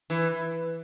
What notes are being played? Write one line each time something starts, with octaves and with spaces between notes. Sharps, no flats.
E3